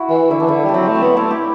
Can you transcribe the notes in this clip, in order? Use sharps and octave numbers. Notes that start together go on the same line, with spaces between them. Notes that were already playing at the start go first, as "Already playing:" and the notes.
Already playing: E4 F#4
E3
D3 E4
E3 D4
D3 E4
G3
D4
F#3 C4
A3
C4
B3
A3 E4
G4